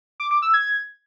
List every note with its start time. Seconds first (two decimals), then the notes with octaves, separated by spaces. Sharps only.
0.20 D6
0.31 D6
0.42 E6
0.53 G#6